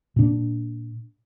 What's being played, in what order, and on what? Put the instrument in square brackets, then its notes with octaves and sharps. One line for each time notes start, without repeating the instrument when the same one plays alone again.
[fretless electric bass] A#2 D4